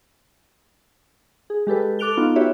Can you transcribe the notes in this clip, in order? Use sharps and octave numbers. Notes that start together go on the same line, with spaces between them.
G#4
G#3 G4 A4 B4
A4 D6 F#6 D7 F7 G7
B3 D#4 F4
F#4 G4 B4 C#5 E5